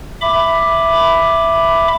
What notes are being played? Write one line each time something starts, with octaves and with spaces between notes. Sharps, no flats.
E5 B5 D6